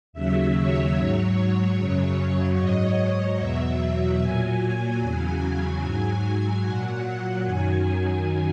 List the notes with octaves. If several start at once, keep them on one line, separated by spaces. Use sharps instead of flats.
D#2 C#3 F#3 E5
C#5
G#2 F#3
F#2 C#3 F#3
G#2 F#3 D#5
E2 B2 F#3 E5
A#2 F#3 G#5
E2 C#3 F#3 G#5
G#2 F#3
A#2 F#3 F#5
F#2 D#3 F#3 G#5